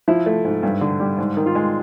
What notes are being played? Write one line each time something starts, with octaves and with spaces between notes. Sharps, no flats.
F3 E4
A3
G#2
G2
D3
G3
G#2
D#3
F4
G#3